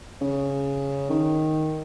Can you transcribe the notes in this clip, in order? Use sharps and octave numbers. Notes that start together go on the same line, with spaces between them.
C#3
D#3